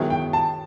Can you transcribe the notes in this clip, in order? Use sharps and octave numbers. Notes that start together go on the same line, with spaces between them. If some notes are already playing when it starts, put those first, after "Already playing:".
Already playing: D#3 F#3 B3 E4 G#4
G5
A5